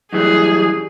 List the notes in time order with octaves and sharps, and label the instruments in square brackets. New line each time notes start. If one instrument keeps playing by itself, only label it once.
[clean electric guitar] F#2 E3 G3 [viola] G#4